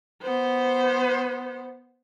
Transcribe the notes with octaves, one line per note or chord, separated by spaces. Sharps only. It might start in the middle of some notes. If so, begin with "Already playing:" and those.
B3 C5